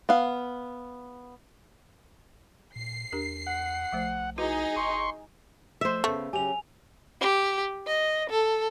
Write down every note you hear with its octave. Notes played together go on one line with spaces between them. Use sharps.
B3 F5
A#2 C7
E2 D4 G4 A#4
F#5
B1 F3 A3 C5
D#4 E4 F#4 G#4 B4 D#5
F#1 C6 C#6
F3 A3 C5 E5
C#3 A3 B3
C#3 F#3 G4 G#5 F7
G4
D#5
A4